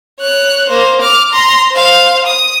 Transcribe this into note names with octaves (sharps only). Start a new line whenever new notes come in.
C#5 F#6
A#3 C5
D6 F6
A#5 C6
C5 F5
D#6